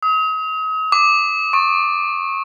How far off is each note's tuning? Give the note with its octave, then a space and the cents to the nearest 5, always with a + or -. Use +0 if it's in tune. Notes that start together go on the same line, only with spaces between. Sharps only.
D#6 +40
D6 +10
C#6 -25